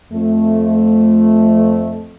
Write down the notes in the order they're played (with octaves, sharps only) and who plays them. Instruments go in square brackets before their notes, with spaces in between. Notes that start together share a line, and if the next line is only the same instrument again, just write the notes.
[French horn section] F2 A3